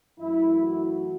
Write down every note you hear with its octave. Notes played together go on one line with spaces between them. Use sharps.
F#2 E3 A3 E4
F#4